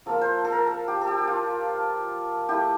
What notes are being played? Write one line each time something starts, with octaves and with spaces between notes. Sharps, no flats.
F3 A#3 F4 A4
C5
A4
A#4
A4
G4
A4
G4
G4
F4
A3 E4 G4